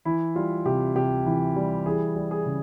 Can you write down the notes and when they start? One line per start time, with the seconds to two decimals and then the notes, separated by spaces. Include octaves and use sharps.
0.05 E3 E4
0.36 G3 F4
0.65 C3 G4
0.95 C3 G4
1.26 E3
1.56 G3
1.86 E3 G#4
2.16 G3
2.31 G#4
2.46 C#3